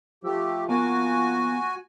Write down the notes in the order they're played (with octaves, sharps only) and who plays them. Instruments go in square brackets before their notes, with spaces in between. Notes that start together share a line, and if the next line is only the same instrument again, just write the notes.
[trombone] F3 [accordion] A3 G4 [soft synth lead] E6
[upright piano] A#3 [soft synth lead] B3 [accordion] F#4 G#5